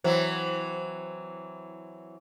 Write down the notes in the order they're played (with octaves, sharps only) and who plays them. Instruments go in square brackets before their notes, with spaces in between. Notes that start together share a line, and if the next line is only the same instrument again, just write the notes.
[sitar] E3 F#3 C4 [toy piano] C5